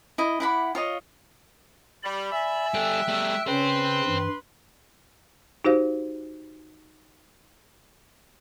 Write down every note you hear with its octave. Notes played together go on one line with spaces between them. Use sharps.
E4 D#5
E4 F#5 B5 D6
F4 C#5 D#5
G3 D5 B5
E5 G#5
G3 A4 G5 F#6
G3 A3
C#3 C#4 B4 C5 G5 C6
G2 E3
D#4 F#4 G4 C5 F5